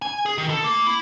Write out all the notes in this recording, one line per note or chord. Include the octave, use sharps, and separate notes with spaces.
G#5
G#4
D#3
A4
A#3
E4